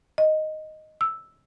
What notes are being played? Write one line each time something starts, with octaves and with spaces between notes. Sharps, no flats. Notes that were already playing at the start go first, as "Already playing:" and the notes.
D#5
E6